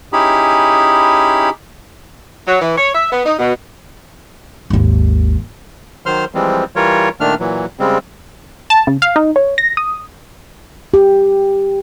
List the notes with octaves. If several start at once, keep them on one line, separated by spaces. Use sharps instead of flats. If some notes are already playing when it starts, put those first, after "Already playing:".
C#4 D#4 E4 G4 G#4 B5
F#3
E3
C#5
E5
B3
D#4
B2
G#1 D#2
D#3 F#3 C5 C6 F6
E3 F3 G3 G#3 C4
E3 G3 F4 A#4 C#5
A#2 D#3 A3 D4 F6
A#2 E3 F#3
C#3 G3 G#3 C4
A5
C#3
F5
D#4
C#5
A#6
D#6
G4